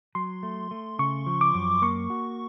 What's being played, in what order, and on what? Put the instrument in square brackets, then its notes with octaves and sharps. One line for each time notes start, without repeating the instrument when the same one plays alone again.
[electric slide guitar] F#3 [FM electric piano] C6
[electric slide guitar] A3
A3
[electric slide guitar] C#3 [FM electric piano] C#6
[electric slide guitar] F3
[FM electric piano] D6
[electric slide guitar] F#2
[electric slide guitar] A#3 [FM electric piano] C#6
[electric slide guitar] F#4